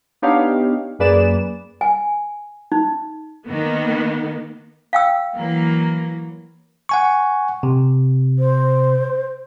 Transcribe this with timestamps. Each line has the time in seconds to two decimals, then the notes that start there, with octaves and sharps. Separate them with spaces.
0.22 B3 D4 D#4 G4 C#5 F5
0.99 F#2 A#3 G#4 B4 D5 E7
1.81 G#5
2.72 D#4
3.46 D#3 A#3 B3
4.93 F5 G5 E6
5.37 E3 F#3 A#3
6.89 F#5 G#5 C#6
7.63 C3
8.38 C5